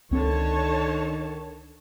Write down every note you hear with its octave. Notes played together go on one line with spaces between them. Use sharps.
C#2 D3 D#3 C4 C#5 A5